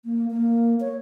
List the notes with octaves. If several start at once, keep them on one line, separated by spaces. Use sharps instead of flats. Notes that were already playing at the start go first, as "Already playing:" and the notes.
A#3
A#3
C#5